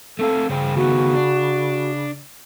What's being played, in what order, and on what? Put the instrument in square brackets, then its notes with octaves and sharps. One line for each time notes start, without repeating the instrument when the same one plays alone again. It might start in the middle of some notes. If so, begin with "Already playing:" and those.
[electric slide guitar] A3 C4 F5 [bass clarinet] A4
[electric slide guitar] G2 C5 G5 [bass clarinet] C#3
[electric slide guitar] D#3 A3 B3 [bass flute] F#4
[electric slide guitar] D4